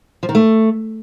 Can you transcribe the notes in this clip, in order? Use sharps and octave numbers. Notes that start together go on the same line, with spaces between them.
F3
D#3
A3